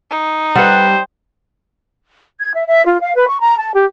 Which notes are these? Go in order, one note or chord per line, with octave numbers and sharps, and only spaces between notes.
D#4
G3 B4 C5 F#5
G#6
E5
E5
F4
F5
B4
C#6
A#5
A5
G4